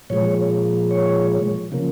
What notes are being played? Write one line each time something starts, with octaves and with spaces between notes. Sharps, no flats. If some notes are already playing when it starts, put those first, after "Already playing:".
A#2 F3 G#3 C#5
C#5
C#3 F3 A#3